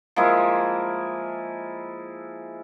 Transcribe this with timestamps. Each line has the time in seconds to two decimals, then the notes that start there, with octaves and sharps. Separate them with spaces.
0.16 F3 G#3 A#3 E4